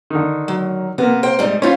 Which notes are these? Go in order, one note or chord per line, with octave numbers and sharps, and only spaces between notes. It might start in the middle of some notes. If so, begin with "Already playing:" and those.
D3 D#3
F#3
C3 A#3 B3
C5 G5
G#2 G3 D#4
C#4 E4 F4 C5